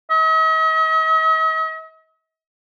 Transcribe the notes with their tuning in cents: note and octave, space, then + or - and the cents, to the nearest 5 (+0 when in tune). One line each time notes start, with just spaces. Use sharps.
D#5 +45